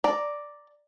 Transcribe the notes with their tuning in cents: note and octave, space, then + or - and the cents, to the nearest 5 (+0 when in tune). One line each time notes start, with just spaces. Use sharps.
D5 +0 A#5 +0